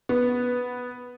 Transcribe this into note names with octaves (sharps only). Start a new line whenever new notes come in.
B3